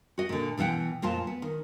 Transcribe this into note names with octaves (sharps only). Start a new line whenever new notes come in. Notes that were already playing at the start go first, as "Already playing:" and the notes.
F#4 D#5
A#2 D3
B2 E3 E5 F#5 G5
F2 A#2 F4 C5 A5
B3
D#3